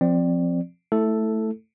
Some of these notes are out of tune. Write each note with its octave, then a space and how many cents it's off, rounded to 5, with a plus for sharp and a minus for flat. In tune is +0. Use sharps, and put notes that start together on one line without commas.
F3 +0 C4 +0 D5 +10
A3 +0 E4 -10 A4 +0